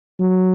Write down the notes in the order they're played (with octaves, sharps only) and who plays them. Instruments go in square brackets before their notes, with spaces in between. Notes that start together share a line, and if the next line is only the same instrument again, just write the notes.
[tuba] F#3